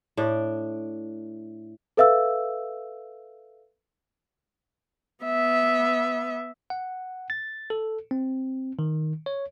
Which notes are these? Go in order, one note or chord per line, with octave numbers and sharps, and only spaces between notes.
A2 D4
A4 B4 E5 F5 E6
B3 E5
F#5
A6
A4
C4
D#3
C#5